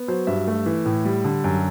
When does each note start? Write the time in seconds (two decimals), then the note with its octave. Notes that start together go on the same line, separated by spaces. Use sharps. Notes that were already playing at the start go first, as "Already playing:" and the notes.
Already playing: B3
0.08 F#3 C5
0.27 G2 E5
0.47 A3
0.66 E3
0.85 A2
1.05 G3
1.24 D3
1.44 F#2